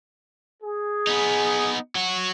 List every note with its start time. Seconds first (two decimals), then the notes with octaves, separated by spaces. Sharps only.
0.63 G#4
1.07 B3 D#4
1.95 F#3 F#4